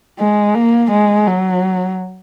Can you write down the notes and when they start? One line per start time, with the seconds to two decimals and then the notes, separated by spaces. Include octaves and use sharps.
0.19 G#3
0.54 A#3
0.91 G#3
1.27 F#3